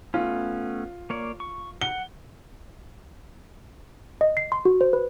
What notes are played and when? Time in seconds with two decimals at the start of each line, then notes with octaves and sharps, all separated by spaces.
0.14 A3 B3 C#4 F4
1.10 A#3 C#5 D5
1.40 C#6
1.81 F#5 G7
4.21 D#5
4.37 C7
4.52 C6
4.65 F#4
4.81 C5
4.93 B4